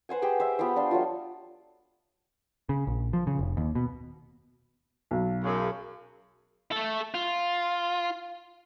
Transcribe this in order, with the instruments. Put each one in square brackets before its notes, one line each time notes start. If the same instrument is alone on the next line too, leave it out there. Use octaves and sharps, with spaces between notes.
[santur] B4 C5 F#5 G#5
G4 G#4 C5 G5
C5 E5
B3 F4 G4 C5
D4 F5 C6
F#3 A3 F4
[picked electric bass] C#3
A#1
F3
C#3
F1
D#2
B2
[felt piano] B1
[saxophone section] F#2 C#3
[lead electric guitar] A3 A4
F4